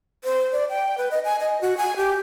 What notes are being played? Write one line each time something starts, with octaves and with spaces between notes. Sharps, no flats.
C5
D5
G5
B4
D#5
G#5
D#5
F#4
G#5
G4